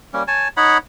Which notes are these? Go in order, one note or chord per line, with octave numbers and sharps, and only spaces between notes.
G3 A#3 C#4
C#5 G#5 A5
D#4 C#5 F#5 B5